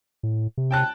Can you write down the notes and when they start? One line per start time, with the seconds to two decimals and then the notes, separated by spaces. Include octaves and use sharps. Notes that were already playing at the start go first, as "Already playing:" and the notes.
0.23 A2
0.58 C3
0.71 G5 A5 F#6